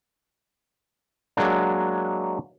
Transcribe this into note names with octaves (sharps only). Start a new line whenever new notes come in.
F#3 G#3 A#3 D4